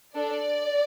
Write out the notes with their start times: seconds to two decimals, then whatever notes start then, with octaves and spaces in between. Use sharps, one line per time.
0.15 D4 A4 D5